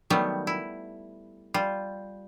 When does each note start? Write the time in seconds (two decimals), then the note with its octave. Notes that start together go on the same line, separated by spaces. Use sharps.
0.10 D#3 F#3 G3 A3 B3
0.47 E4
1.54 G3 F4